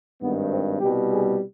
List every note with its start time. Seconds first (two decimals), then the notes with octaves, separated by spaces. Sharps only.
0.21 G#1 G2 D#3 B3
0.51 C4
0.80 C2 B2 G3 G4
1.10 G#4